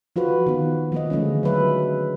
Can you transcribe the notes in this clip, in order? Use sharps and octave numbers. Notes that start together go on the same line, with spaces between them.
F3 F4 F#4 B4
D#3 B3
F3 A#3 D#5
D3 G#3 A3 C#4
F#3 B4 E5